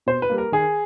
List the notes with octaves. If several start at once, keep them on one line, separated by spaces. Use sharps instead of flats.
B2 C5
B4
G3 A#3
A#4
D#3 G#4